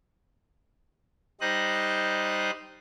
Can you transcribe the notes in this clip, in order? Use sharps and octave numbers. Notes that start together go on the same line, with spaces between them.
G3 D#4 C5 D#5 F#6